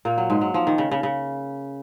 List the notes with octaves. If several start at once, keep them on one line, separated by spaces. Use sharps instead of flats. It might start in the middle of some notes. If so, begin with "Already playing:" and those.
A#2 A#3
F#3
G#2 G#3
F#3
F3
D#3
C#3
C#3
C#3